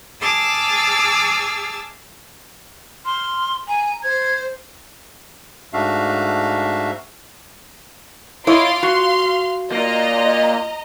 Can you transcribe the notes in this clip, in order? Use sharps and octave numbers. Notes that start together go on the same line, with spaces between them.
G#4 A5 D6 E6 F6
C6 F6
G#5 A#5
C5 G#6
G#2 A3 D4 F#4 E5 F5
E4 F4 C#5 D#5 C6 D6
F#4 F5 C6
A#3 F4 D#5 A#5